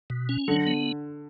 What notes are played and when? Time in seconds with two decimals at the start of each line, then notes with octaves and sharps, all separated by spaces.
0.10 B2
0.29 C#4
0.48 D3 F#3
0.67 B3